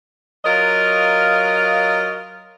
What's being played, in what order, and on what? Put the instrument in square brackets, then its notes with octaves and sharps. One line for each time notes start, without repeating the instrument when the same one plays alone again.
[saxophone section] F#3 F4 A#4 D#5 F5